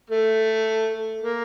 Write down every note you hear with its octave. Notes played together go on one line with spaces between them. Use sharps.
A3
A#3